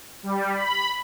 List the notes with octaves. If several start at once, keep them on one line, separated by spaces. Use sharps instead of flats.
G3
B5